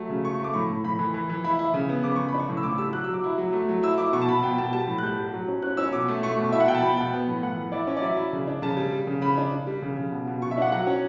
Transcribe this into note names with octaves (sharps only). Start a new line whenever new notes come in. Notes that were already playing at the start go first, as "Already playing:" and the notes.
Already playing: F#3 A3
C#3
A3 C#6
C#6
A3
D6
A2 C#6
A2
A2 B5
E3
E3
E3
E4 B5
E4
C#3
B3
C#3 D6
C#3 C#6
B5
D4
C#6
A2
E6
A2 D6
G3 E6
F#3 F#6
E6
F#3 D6
E4
F#3
A3
F#3
E4 E6
E4 D6
B2 C#6
A5
B2 B5
B2 G5
B2 A5
G3 A5
A2
F#6
G3 G6
G3
F#3
C#4
C#4 F#6
C#4 E6
B2 D6
A3
A3 C#6
B2
E4 E5
F#5
B2 G5
A5
B2 B5
B2 G5
B3
A2
E3 F#5
E3
E4 D5
C#4
D5
F#3 E5
E4
C#3
D4
C#3 A5
G3
G3
C#3
C#3 B5
D4
D4
G3
C#3
C#3
B2
B2
B2 C#6
E5
D4 F#5
F#3 F#5
C#4